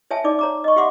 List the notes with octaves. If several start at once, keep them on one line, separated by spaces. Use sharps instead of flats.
C#5 E5 G#5 A5
D#4 D5 D6
C#5 A#5 D6
D#5 C#6
G4 E5 F#5 C6 D6